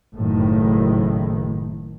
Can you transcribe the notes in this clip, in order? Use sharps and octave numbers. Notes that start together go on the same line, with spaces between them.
F#1 A2 D#3